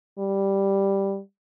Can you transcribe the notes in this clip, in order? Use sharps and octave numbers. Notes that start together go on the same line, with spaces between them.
G3